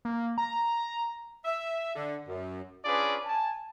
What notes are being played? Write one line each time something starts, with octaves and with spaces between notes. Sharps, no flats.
A#3
A#5
E5
D3
F#2
C#4 D4 F4 G#4 B4 D5
G#5 A5